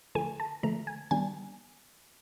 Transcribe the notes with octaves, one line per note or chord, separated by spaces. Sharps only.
D3 F3 A3 G#5
A5
D3 F3 A3 A#5
G#5
D#3 G3 B3 D4 G#5